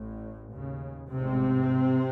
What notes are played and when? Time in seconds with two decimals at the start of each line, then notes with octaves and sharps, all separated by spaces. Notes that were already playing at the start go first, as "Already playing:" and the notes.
Already playing: A1 A2
0.51 D#2 C#3
1.09 A1 G#2 C3 C4